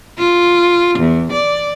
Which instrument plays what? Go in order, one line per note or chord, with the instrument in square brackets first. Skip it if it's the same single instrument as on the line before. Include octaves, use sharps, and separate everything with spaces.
[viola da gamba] F4
E2
D5